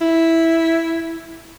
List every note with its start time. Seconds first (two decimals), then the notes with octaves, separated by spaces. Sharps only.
0.01 E4